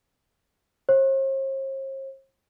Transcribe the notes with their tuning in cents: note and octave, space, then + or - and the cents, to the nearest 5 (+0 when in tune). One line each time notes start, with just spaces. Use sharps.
C5 +45